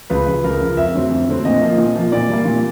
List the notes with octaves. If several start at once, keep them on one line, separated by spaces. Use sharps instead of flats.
C#2 B4
C#3 F3
C#2 A#4
C#3 F3
F2 E5
D3 F#3 A3 C4
F2
D3 F#3 A3 C4
A#2 D#5
F3 A#3
A#2
F3 A#3
A#2 D5
G3 A#3
A#2